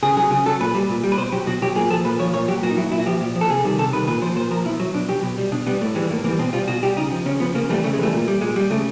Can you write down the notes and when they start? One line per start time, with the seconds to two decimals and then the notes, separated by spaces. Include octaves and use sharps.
0.03 C#3 G#4
0.17 F#3 G#4
0.31 C#3 G#4
0.46 F#3 A4
0.60 A#2 B4
0.75 G3
0.89 A#2
1.03 G3
1.12 B4
1.18 B2 C5
1.32 F#3 G4
1.47 B2 F#4
1.62 F#3 G4
1.75 A#2 G#4
1.90 F3 A4
2.05 A#2 B4
2.20 F3 C#5
2.34 A#2 C#5
2.48 F#3 G4
2.63 A#2 F#4
2.71 D#4
2.77 F#3 E4
2.92 A#2 E4
2.99 F#4
3.06 F3 G4
3.21 A#2
3.36 F3
3.41 A4
3.49 C3 G#4
3.64 D#3 G3
3.79 C3 A4
3.92 D#3 G3 B4
4.07 A#2 B4
4.22 F3 C5
4.36 A#2 C5
4.51 F3 A#4
4.65 B2 E4
4.80 F#3
4.94 B2 D4
5.08 F#3 G4
5.23 B2
5.37 G3
5.52 B2 D4
5.66 G3 B3
5.81 A2 A3
5.95 E3 G3 G#3
6.04 A3
6.10 A2 A#3
6.24 E3 A#3
6.29 G3
6.39 B2 C4
6.53 G3 F4
6.68 B2 F#4
6.83 G3 G4
6.96 C#3 D#4
7.11 F3
7.26 C#3 C#4
7.40 F3 B3
7.55 C#3 A#3
7.69 E3 G3 A3
7.84 C#3 A3
7.93 G#3
7.98 E3 G3 A3
8.13 A#2
8.28 G3
8.41 A#2 G#3
8.56 G3
8.70 C#3 A3